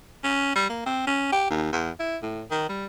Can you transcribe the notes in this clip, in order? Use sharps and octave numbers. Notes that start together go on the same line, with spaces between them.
C#4
G3
A#3
C4
C#4
G4
D#2
E2
E4
A2
D#3
G3